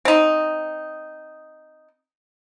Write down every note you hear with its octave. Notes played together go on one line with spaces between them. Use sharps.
C4 D#4